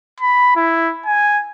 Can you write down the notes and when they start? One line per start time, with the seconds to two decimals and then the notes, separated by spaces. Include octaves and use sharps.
0.20 B5
0.56 E4
1.06 G#5